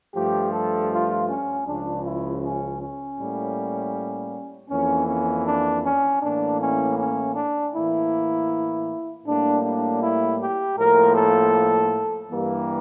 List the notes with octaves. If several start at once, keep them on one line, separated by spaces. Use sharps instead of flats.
G2 F3 A3 G4
A4
F4
C#4
C#2 C#3 F3 D4
E4
C#4
C#4
A2 G3 A#3
F2 E3 A#3 C#4
C#4
D4
C#4
A2 E3 A#3 D4
C#4
C#4
D4
A2 E3 A#3 E4
A2 G3 A#3 D4
D4
E4
G4
A2 F3 A#3 A#4
A4
G2 E3 G3 A#3